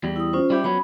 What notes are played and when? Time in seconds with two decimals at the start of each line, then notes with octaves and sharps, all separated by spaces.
0.04 E2 G3
0.16 E4 D#6
0.33 C#4 F4 C5
0.50 G3 E4 G4
0.64 F#3 B3 C#4 B5